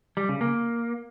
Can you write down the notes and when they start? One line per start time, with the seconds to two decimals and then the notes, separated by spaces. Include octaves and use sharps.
0.17 G3
0.29 C#3
0.41 A#3